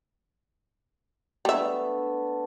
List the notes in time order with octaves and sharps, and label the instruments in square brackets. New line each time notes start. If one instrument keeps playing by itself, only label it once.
[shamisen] G3 E5 [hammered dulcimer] A3 B3 D4